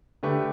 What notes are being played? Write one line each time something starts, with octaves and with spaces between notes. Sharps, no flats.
D3 A3 G4 B4